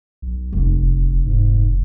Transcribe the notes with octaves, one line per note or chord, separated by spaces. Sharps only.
B1
F1
D1
G#2